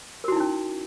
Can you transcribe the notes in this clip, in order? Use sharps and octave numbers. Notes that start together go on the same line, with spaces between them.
C#4 D#4 E4 F#4 A#4